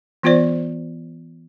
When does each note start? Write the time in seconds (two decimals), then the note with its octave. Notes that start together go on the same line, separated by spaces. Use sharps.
0.23 E3 B3 F4 C5 D5